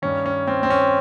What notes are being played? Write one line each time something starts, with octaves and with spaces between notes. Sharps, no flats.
G2 D#3 C#4
C#4
C4
C4
C#4